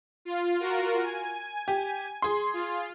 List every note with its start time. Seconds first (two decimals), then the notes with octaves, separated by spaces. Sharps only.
0.25 F4
0.60 F4 F#4 A#4
1.01 G#5
1.68 G4
2.22 G#4 C6
2.53 F4